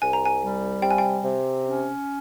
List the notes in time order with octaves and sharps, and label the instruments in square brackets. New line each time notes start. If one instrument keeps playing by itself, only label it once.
[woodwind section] C2 [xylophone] G#5
[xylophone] A#5
G#5
[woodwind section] G3
[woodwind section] C3 [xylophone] G5
[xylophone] G#5
G5
[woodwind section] C3
C#4